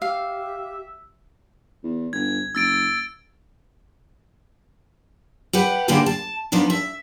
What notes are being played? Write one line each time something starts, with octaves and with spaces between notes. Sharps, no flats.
G4 E5 F5
E2
G1 G#6
F#1 E6 A6 D7
G4 B4 F#5
D3 A#3 B3 E4 G4 G#4
A5
F3 B3 D4 D#4
E5